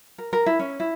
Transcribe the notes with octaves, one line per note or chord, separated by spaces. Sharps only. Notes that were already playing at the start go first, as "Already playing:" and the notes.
A#4
A#4
E4
C#4
E4